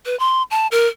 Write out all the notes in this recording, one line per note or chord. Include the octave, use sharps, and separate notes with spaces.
B4
C6
A5
A#4